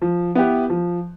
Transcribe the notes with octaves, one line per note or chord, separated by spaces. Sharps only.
F3
B3 E4 G4 B4
F3